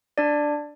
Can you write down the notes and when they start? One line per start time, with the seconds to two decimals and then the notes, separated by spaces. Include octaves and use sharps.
0.18 D4 D5